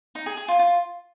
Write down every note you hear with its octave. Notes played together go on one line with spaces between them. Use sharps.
D#4
G#4
G#4
F4
F4